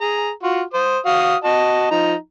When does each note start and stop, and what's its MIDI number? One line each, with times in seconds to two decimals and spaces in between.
0.01 0.30 68
0.01 0.30 82
0.43 0.62 65
0.43 0.62 66
0.73 0.98 72
0.73 0.98 87
1.06 1.36 66
1.06 1.36 77
1.06 1.36 87
1.44 1.91 66
1.44 1.91 75
1.44 1.91 81
1.91 2.14 53
1.91 2.14 63
1.91 2.14 82